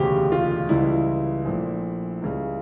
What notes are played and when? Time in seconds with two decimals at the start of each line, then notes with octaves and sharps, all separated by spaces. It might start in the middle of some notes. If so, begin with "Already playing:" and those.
Already playing: E1 D2 C#3 G4
0.32 F4
0.69 C#2 C#3 E3 G3 E4
1.45 A#1 A#2 A3
2.22 C#2 C#3 G3